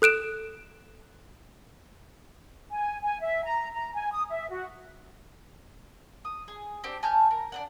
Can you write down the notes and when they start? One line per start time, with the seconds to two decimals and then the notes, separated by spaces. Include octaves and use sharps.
0.02 A4 F#6 D7 E7
2.71 G#5
3.02 G#5
3.21 E5
3.45 A#5
3.72 A#5
3.94 G#5
4.12 D#6
4.29 E5
4.50 F#4
6.25 D#6
6.48 G#4
6.84 C4 D4 G4
7.03 G#5 A5 F6 G6
7.31 A#4
7.52 D4 D#5 F#5